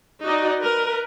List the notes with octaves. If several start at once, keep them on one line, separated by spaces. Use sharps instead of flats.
D#4 F#4 D5 D#5
A#4 B4